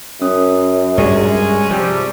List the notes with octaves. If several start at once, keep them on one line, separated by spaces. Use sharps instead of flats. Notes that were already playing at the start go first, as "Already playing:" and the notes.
F#2 C#4 D#6
G2 G3 G#3 C#4 G#4 D5
C3 F3 G3